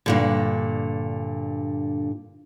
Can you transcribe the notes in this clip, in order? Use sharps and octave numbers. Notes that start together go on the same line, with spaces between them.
G2 A#2 D3